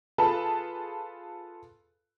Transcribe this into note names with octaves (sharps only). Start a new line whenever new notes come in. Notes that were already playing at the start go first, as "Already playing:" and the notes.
F4 G#4 A4 B4 A5 B5